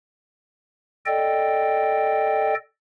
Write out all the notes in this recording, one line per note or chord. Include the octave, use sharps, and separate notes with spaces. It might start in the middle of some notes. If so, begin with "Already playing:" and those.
A4 D5 D#5 G5